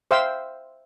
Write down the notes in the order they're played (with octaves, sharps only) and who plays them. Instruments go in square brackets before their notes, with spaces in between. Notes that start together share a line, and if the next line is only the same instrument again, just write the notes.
[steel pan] C5 E5 F5 G5 C6 E6